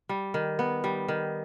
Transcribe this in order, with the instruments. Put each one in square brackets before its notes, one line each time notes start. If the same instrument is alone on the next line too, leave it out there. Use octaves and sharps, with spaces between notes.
[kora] G3
D#3
B3
G3
D#3